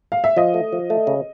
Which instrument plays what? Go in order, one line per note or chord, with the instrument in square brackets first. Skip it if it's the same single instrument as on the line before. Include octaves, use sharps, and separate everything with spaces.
[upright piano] F5
E5
[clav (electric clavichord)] F3 [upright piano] D#5
[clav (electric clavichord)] A3
F3
A3
C#3